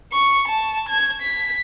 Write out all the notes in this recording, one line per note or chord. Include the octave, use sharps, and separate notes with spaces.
C#6
A5
G#6
B6